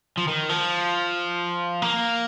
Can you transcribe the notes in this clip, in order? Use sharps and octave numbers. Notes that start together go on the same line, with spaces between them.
F3
D#3
F3
A#3